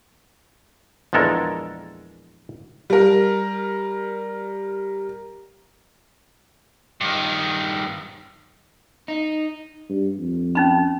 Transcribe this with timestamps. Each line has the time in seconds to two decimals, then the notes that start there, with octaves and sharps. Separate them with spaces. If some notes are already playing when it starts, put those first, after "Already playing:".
1.13 A#1 E2 G#3 A4 A#4
2.90 G3 A#4
7.01 G2 D#3
9.08 D#4
9.90 G2
10.18 F2
10.55 C#4 D#4 B5